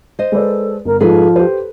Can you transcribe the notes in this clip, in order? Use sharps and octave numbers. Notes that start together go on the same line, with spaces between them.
C5 D#5
G#3 A4 B4 D5
G1 A#4
G#2 F3 G#4 A4 B4
G4 B4 C5